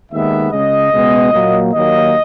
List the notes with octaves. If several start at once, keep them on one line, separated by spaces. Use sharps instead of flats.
D#2 D#3 G#3 B3 E5
C#2 C#3 G#3 D#5
C#2 B2 G#3 B3
A#2 F#3 A#3
D#2 D#3 F#3 A#3 D#5